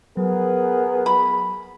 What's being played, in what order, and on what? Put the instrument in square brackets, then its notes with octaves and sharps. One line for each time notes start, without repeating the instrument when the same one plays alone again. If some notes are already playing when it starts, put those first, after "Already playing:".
[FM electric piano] F#3 [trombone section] B3 G#4 A#4
[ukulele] B5